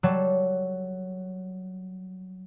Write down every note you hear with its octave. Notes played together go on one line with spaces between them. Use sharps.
F#3 G3 A4